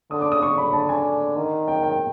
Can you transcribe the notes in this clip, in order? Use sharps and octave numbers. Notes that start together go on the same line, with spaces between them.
D3 D#6
D6
D#6
D3 C#6
B5
D3 A5
G#5
D#3
G5
G5